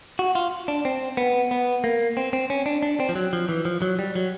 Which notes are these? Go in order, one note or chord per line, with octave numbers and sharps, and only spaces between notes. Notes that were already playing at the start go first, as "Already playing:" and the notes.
F#4
F4
D4
C4
B3
B3
A#3
C4
C4
C#4
D4
D4
C4
F3
F#3
F3
E3
F3
F#3
G3
F#3